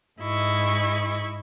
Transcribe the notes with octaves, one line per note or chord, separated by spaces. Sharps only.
G#2 E4 D#5 C#6